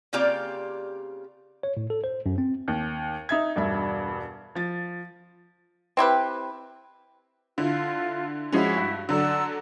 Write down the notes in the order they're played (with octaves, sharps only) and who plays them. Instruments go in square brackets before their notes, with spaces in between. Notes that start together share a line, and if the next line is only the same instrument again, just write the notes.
[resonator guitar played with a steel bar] C#3 A#3 C4 F4 G4 D5
[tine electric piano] C#5
A2
A4
C5
F#2
C4
[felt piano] D#2
D#4 E5 G#6
E1 G2 E5
F3 A6
[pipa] C4 E4 G4 B4
[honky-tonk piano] D3 E4 [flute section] F4
[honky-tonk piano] F3 G#3 C#4 [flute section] E4 F#4
[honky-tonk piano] G2
[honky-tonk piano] D3 F#3 A4 [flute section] D5 F#5 E6